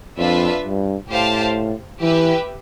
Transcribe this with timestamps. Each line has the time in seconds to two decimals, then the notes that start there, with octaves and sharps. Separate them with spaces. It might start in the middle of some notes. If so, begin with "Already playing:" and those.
0.18 F2 D4 F4 B4 E5
0.64 G2
1.09 A2 G4 C5 F5 A5
2.01 E3 G4 B4 E5